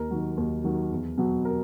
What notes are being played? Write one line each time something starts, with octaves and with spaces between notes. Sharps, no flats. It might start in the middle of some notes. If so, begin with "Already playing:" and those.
Already playing: D#2 A#4
D#3 F#3
D#2
D#3 F#3
E2
B2 F#3
A#4